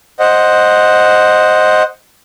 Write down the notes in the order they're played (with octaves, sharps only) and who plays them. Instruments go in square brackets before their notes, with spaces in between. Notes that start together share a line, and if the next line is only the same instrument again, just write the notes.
[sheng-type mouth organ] C5 D#5 F#5